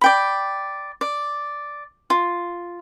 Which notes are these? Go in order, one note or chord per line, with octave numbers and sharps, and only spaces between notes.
D5 G5 B5
D5
F4